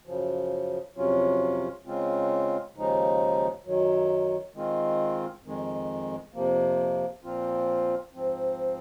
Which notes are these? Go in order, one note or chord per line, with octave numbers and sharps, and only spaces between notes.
F#2 C#3 F3
F2 C3 F#3 C#4 F4
C#3 G#3 C4 F4
D#2 C#3 F3 G#3 D#4
F#2 D#3 F#3
D#3 G#3 C4 F4
F2 D#3 G#3
F2 C3 F3 A#3
A#2 F3 C4 F4
G#2 F3 C4